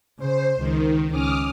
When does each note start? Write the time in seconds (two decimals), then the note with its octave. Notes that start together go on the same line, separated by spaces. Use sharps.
0.19 C#3 C5
0.58 C#2 D#3
1.10 C#2 C#4 D6 D#6 F6